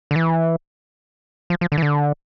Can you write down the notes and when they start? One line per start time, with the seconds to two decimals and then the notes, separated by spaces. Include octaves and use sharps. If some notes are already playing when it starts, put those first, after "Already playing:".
0.11 D3
0.16 E3
1.50 F3
1.61 F3
1.72 D3
1.78 E3
1.82 D3